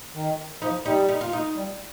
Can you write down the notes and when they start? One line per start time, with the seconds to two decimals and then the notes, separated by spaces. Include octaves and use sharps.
0.15 D#3
0.62 F3 D#4
0.85 G3 D#4
1.09 D#4
1.21 F4
1.33 D#4
1.56 G3